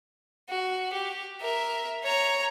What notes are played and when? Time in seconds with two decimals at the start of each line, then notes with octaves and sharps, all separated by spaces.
0.49 F#4
0.93 G4
1.41 A#4 E5
2.03 C#5 A#5